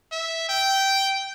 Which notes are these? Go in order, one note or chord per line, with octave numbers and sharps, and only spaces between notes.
E5
G5